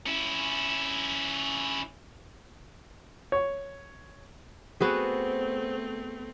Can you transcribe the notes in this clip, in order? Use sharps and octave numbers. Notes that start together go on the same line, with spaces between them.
C#4 E4
C#5
A3 B3 C4 F#4 G#4 C5